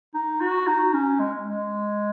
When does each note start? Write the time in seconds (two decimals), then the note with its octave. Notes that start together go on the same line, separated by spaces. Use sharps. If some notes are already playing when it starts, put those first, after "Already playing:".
0.14 D#4
0.41 F#4
0.67 D#4
0.94 C#4
1.20 G#3
1.47 G#3